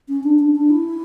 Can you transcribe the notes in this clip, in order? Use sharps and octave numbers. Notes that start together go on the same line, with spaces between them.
C#4
D4
D4
D4
E4